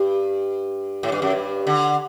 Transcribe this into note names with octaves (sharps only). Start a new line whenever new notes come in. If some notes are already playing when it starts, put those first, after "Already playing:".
Already playing: G2
A2
G2
F#2
G2
D3